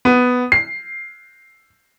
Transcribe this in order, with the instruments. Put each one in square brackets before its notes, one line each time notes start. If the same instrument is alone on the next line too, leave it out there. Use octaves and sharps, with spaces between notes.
[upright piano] B3
C7